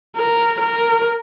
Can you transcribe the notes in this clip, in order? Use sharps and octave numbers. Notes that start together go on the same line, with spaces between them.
A#4
A#4